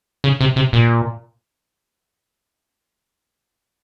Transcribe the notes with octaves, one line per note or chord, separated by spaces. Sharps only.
C#3
C3
C3
A#2